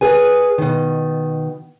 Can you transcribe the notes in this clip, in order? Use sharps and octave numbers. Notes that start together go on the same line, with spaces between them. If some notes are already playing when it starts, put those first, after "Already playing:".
G#4 B4 G#5
B2 D#3